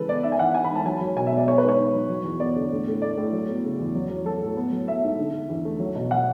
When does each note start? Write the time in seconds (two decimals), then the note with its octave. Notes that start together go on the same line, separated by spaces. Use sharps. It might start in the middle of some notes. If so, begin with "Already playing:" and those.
Already playing: C#3 E3 G#3 A4 B4
0.09 B3 D5
0.23 G#2 E5
0.32 G#5
0.39 E3 F#5
0.54 E3 G#5
0.64 B5
0.71 G#2 A5
0.85 F#3 G#5
1.01 F#3
1.16 B2 G#5
1.27 E5
1.32 B3 D5
1.47 B3 C#5
1.58 B4
1.63 G#2
1.69 C#5
1.79 G#2
1.93 F#3
2.09 F#3
2.24 E2
2.40 B3 D5
2.56 D3
2.71 A2
2.87 A2
3.02 A3 D5
3.17 A2
3.33 F#3
3.48 B3
3.64 C#3
3.79 E2
3.95 F#3
4.10 F#3
4.25 F#3 A4
4.41 A2
4.57 B3
4.72 F#3
4.87 B3 E5
5.03 G#2
5.19 D3
5.33 D3
5.49 E2
5.65 A3
5.79 F#3
5.95 B2
6.11 F#3 F#5